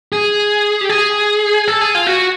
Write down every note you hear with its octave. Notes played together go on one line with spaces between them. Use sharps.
G#4
G4
G#4
A4
G#4
F4
F#4